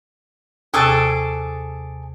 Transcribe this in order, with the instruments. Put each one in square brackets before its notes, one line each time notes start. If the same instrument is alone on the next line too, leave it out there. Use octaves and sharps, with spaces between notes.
[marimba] D#2 C3 C#6 [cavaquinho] G#4 A4 D5